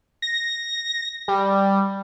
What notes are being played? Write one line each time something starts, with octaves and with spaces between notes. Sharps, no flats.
A#6
G3